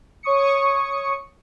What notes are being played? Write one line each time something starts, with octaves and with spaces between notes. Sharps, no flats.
C#5 C#6 D#6 C#7